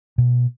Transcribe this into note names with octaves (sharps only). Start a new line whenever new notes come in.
B2